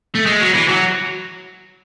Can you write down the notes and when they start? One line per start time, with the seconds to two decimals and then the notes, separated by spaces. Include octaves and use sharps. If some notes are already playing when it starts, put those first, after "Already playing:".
0.15 A3
0.26 G#3
0.41 F#3
0.54 E3
0.69 F#3